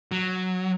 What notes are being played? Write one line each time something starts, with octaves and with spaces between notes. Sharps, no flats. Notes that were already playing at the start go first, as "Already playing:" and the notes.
F#3